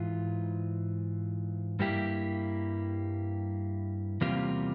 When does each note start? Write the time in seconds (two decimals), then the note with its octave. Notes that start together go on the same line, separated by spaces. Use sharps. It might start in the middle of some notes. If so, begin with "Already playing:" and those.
Already playing: G#2 E3 F4
1.79 G2 G3 A#3 E4 G4
4.21 E2 C3 G3 A#3 F4